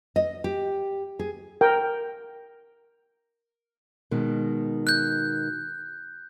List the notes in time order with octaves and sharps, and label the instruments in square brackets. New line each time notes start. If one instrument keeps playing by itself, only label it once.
[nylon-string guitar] D#5
G4
G#4
[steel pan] A#4 G5
[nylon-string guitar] B2 D#3 G#3
[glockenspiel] F#6 G6